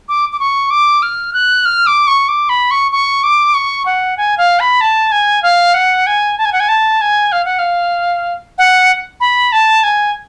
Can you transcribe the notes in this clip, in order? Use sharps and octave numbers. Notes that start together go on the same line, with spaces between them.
D6
D6
C#6
D6
F6
F#6
F6
D6
C#6
D6
B5
C#6
C#6
D6
C#6
F#5
G#5
F5
B5
A5
G#5
F5
F#5
G#5
A5
G#5
F#5
G#5
A5
G#5
F5
F#5
F5
F#5
B5
A5
G#5